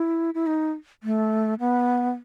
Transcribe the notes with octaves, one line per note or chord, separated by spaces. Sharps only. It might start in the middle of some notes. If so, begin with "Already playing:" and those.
Already playing: E4
E4
D#4
A3
B3